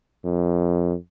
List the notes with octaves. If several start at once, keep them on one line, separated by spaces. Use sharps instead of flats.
F2